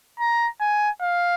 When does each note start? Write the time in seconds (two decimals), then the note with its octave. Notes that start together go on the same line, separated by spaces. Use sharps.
0.20 A#5
0.61 G#5
1.02 F5